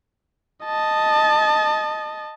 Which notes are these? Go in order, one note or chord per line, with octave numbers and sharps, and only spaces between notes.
D#5 A5